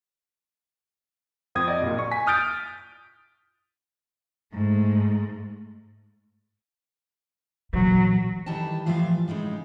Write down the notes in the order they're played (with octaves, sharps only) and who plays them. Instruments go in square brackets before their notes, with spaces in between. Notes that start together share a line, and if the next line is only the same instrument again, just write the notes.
[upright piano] F2 C4 D#6 G#6
D5 D#5
F#1 A#2
C#6
G#5 B6
D#6 F6 G6 A6 D7
[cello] G#2 A3
[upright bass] A#2 E3 [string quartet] F#3
[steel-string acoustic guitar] D#3 E3 G3 G5 A5
A2 E3 F3 F4 E5 F5
A2 C#3 G#3 D#4